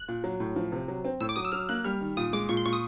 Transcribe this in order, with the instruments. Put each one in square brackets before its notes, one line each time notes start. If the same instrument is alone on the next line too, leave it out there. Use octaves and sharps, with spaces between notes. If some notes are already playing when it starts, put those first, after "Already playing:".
Already playing: [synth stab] F#6
[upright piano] A#2
F#3
A2
F3
C3
F#3
C4
[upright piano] A2 [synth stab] E6
[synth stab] D6
[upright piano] F#3 [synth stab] D#6
[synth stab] E6
[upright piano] F#3 [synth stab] F6
[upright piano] A#3 [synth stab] F#6
[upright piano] G3 [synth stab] F6
[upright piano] D#3
[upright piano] A#2 [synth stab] D#6
[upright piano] G#3 [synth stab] D6
[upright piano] A#2 [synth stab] C#6
[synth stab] C6
[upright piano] A#2 [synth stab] C#6
[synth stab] D#6